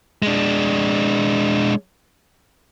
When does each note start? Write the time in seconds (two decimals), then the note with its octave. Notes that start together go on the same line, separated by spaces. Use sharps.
0.22 G#3 D4